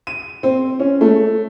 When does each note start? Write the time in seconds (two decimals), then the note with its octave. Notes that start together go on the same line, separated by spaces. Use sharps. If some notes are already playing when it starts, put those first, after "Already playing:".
0.07 D#7
0.43 C4
0.80 C#4
1.01 A3